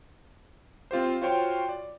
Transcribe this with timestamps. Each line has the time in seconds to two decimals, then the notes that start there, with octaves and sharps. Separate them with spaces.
0.91 C4 F4 G4 C5
1.22 F4 F#4 C5 C#5 G5 C6
1.69 D5